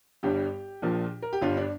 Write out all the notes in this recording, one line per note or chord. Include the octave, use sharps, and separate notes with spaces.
G1 G2 G3 G4
A#1 A#2 F3
A#4
G4
G1 G2 G3 F4
D4